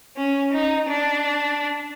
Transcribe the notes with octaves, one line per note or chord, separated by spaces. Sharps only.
C#4
D#4
D4